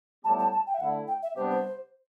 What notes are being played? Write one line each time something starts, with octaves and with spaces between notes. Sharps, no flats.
A2 G3 B3 E4 G4 A5
A5
A5
G5
E5
D3 A3 E4 F#5
G5
E5
C3 G3 B3 D4 G4 C5
C5